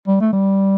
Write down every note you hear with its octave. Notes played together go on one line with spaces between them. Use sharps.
G3
A3
G3